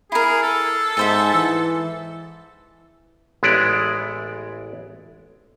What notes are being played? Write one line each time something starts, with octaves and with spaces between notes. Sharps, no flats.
E4 G#4 A#4
A4
G#2 G#4 C5 E5
E3
A1 G#3 B3 E4 D5